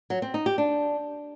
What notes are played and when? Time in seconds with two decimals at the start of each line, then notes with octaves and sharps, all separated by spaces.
0.10 F#3
0.22 C4
0.34 D#4
0.46 G4
0.58 D4